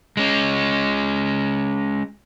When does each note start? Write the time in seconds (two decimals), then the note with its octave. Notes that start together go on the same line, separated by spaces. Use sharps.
0.17 G#3 C#4